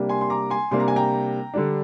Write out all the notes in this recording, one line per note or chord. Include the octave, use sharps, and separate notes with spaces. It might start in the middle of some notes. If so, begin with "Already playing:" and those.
Already playing: C3 G3 A#3 D4
G#5 C6
C6
A#5 D6
G#5 C6
C3 G3 A#3 D4 C6
A#5
G#5
G5 A#5
D3 G3 D4